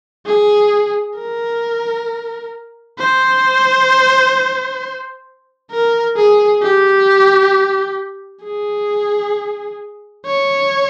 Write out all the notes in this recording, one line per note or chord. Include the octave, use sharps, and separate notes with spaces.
G#4
A#4
C5
A#4
G#4
G4
G#4
C#5